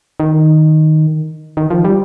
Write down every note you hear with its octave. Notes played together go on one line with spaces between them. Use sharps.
D#3
D#3
F3
G3